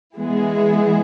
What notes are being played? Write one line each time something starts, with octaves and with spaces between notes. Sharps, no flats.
E3 G#3 B3 E4 G#4